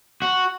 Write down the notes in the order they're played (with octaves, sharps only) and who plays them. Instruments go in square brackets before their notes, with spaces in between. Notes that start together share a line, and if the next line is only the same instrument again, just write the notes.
[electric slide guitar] F#4